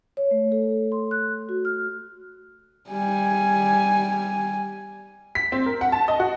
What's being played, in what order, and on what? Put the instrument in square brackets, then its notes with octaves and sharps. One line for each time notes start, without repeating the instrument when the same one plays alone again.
[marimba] C#5
A3
A4
C6
F#6
F#4
F6
[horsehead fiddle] G3 G#5
[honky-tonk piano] B6
C4
A#4
F#5
A5
D#5
F#4